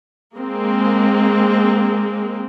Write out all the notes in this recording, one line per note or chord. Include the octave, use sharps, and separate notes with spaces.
G#3 A#3 C4